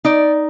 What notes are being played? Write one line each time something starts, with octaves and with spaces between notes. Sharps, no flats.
D#4 D5